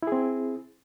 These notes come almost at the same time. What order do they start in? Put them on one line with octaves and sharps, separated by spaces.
E4 G#4 C4